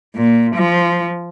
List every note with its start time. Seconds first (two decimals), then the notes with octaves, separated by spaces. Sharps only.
0.15 A#2
0.55 F3